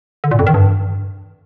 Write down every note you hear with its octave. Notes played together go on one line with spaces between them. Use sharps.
D3
A#2
F2
D#3
G2